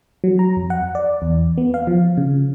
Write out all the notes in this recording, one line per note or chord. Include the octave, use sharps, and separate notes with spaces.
F#3
A#5
F2
F#5
D5
E2
B3
F5
F3
C#3